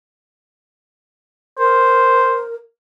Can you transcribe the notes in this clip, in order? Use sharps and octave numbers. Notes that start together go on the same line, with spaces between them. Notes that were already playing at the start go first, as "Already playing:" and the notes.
A#4 C5